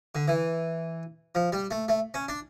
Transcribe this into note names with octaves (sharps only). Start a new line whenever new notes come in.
D3
E3
F3
G3
A3
A3
C#4
D4